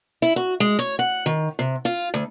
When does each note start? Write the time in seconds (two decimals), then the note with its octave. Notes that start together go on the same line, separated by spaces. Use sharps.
0.22 E4
0.36 F#4
0.60 G#3
0.79 C#5
0.99 F#5
1.26 D#3
1.59 C3
1.85 F4
2.14 D2